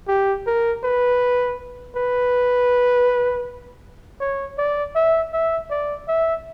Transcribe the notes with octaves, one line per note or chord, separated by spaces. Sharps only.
G4
A#4
B4
B4
C#5
D5
E5
E5
D5
E5